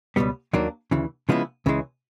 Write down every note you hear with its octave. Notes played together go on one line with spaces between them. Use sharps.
C#2 B2 G3 B3
D#2 D#3 F#3 A#3 D4
D2 C#3 E3
C#3 F3 G#3 B3 E4
C#2 C#3 E3 G#3